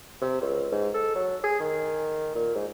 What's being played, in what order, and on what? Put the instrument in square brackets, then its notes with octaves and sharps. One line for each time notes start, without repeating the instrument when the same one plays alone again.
[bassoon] C3
C#2
G#2
A4
F#3
G#4
D#3
A#2
G#2